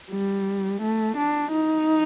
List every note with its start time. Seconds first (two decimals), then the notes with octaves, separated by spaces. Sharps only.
0.11 G3
0.82 A3
1.17 D4
1.51 D#4